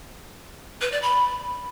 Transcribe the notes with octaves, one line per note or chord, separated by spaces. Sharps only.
B4
D5
B5